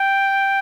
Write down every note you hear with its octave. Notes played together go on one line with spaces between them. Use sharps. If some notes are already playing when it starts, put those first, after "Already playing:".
Already playing: G5